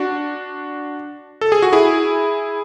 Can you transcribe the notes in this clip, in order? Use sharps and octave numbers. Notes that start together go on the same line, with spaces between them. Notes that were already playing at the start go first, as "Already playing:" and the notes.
Already playing: D4 F#4
A4
G#4
F#4
E4 G#4